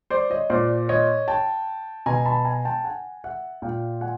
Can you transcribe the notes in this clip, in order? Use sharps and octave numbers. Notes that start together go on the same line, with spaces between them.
C5 D5
C#5 D#5
A#2 C5 D5
C#5 D#5
G5 A5
B2 G#5 A#5
A5 B5
G#5 A#5
G5 A5
F#5 G#5
E5 F#5
A#2 F5 G5
F#5 G#5